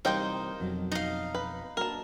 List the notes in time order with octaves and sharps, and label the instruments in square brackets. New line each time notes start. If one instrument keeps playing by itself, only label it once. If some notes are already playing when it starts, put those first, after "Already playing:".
[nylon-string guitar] C3 E3 G3 [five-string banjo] A#3 D#5 G5 [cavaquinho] D#4 C5
[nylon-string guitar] F2 B2 F#3
[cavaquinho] D#4 F5
[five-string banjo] B4
[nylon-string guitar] A#3 D4 F#4 [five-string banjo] A#4 A5